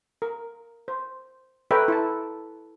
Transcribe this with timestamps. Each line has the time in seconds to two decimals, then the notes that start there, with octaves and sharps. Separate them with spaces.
0.22 A#4
0.88 C5
1.71 A4 B4 C#5 E5 G5 A#5
1.88 E4 A5